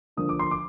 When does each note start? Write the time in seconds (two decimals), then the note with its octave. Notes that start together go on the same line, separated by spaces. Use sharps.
0.17 D3 F3 A#3 D4 D#6
0.29 D6
0.39 C6
0.51 D6